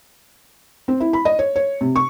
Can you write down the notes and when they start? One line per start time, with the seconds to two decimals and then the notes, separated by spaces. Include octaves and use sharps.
0.88 C4
1.00 E4
1.13 B5
1.25 D#5
1.39 C#5
1.56 C#5
1.81 C3
1.96 C#6